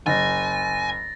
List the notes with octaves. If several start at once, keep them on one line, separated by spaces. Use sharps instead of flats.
F#1 G#5 A6 A#6